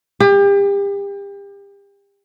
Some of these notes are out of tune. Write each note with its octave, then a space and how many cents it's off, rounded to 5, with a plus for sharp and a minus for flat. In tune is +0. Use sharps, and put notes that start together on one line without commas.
G4 +35